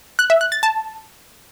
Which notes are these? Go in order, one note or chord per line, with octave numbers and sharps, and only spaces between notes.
F#6
E5
F#6
A6
A5